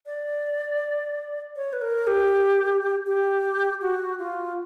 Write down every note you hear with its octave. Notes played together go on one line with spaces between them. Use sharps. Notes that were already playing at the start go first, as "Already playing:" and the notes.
D5
C#5
B4
A#4
G4
G4
F#4
F4